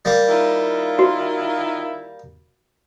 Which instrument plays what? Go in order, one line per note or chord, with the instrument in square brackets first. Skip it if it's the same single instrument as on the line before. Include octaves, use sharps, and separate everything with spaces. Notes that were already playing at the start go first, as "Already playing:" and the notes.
[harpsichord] G3 A#3
[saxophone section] D#3 E4 F4
[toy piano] F#4